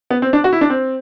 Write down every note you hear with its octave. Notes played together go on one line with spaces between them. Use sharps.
B3
C4
D4
F#4
E4
D4
C4